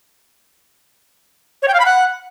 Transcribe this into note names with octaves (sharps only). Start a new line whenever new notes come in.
C#5
G5
F5
B5
F#5